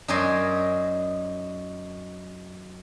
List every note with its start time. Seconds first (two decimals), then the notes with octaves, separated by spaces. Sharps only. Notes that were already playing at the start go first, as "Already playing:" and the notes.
0.08 F#2 D#4 A#4 D5 G#5 C6